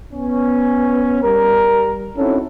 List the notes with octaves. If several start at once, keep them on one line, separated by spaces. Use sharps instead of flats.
B3 C#4
G3 A#4
C4 C#4 D#4 E4 F#4 A4